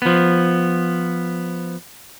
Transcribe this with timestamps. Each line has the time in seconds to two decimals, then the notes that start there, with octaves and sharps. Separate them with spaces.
0.02 F3 B3